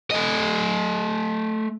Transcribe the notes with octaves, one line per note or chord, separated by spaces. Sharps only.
A3 D#5